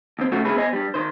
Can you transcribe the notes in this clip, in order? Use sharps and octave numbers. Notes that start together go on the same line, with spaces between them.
D#2 C4
C#3 A3 F4 F#4
C#3 G#3 B3 E4 G#4 B4
B3 C5 D#5 G#5
G2 G3
D#3 C5